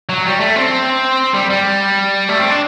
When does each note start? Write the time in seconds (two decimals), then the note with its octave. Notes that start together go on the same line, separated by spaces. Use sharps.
0.09 F#3
0.25 G3
0.40 A3
0.56 C4
1.34 G3
1.50 G3
2.29 A3
2.39 C4
2.50 D4